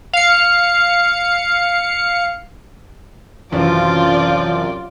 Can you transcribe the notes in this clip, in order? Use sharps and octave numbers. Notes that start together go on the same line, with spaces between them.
F5 C#7
G#1 F#2 C3 E3 F3 F4 D5